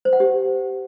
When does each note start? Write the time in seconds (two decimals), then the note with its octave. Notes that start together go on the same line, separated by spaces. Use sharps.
0.05 C5
0.13 F#5
0.20 G4